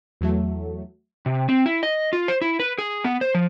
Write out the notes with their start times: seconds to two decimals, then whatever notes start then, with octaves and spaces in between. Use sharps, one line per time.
0.21 E2 F#3 A3
1.26 C3
1.49 C4
1.66 E4
1.83 D#5
2.13 F4
2.28 C5
2.42 E4
2.59 B4
2.78 G#4
3.04 B3
3.21 C5
3.35 F3